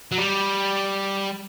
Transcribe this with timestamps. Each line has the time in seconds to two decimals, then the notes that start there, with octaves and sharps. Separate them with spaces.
0.12 F#3
0.18 G3